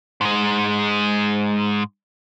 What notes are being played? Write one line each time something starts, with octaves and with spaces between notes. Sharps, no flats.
G#2 G#3